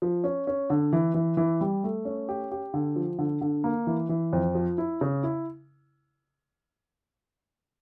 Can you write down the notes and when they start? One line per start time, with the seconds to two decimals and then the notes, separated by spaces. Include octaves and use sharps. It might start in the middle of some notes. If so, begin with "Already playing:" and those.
0.02 F3
0.24 C#4
0.47 C#4
0.70 D3
0.93 E3
1.14 E3
1.37 E3
1.61 G3
1.84 A3
2.05 C#4
2.29 G4
2.51 G4
2.74 D3
2.96 F3
3.19 D3
3.41 D3
3.64 A#3
3.87 E3
4.09 E3
4.33 F2
4.55 F3
4.78 E4
5.01 C#3
5.23 E4